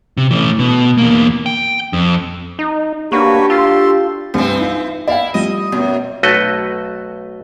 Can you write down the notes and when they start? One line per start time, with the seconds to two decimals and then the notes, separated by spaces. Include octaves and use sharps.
0.17 C3
0.31 A2 E3
0.59 B2
0.98 E2 A#3
1.46 G5
1.93 F2
2.59 D#4
3.12 A#3 D4 F#4 G4 B4 C#5
3.50 F4 A4 A5 C6
4.34 C2 G2 C3 E3 C4
4.59 D#4 F4
5.07 E4 D5 F5 G5
5.34 F3 G3 D#5
5.72 F#2 B2 B3
6.23 B1 A3 F#4 B4 D#5